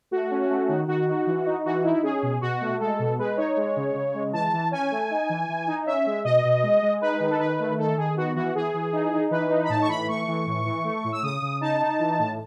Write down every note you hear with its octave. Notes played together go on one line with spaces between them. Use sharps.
A3 F#4
C#4
A3
D#3
D#3 F#4
D#4
E3
D#4
E3 F#4
D#4 E4
C#4 G#4
B2
B2 F#4
A3
G#3 A4
B2
G#3 B4
D#4 C#5
G#3
C#3
C#3
G#3
E3 A5
E3
C#4 G#5
A3
D#4
E3
E3
D#4
C#4 E5
G#3
B2 D#5
B2
G#3
G#3
D#4 B4
D#3
A4
D#3 B4
A3
D#3 A4
D#3 G#4
B3 F#4
E3 F#4
E3 G#4
E3
D#4
D#4
E3 B4
D#4
B5
A2 A5
C#6
E3 B5
A3 C#6
E3
A2
E3
A3
A2
E6
C#3 D#6
C#3
D#4 A5
D#4
E3
A2